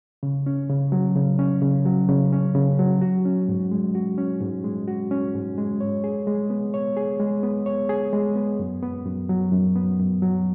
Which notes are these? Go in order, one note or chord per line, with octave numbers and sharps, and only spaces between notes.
C#3
C#4
C#3
F#3
C#3
C#4
C#3
F#3
C#3
C#4
C#3
F#3
F#4
C#4
G#2
G#3
F#4
C#4
G#2
G#3
F#4
C#4
G#2
G#3
C#5
G#4
G#3
B3
C#5
G#4
G#3
B3
C#5
G#4
G#3
B3
F#2
B3
F#2
F#3
F#2
B3
F#2
F#3